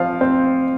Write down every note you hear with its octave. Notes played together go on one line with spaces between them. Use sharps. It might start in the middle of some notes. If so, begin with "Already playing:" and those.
Already playing: F3 C4 F5
C4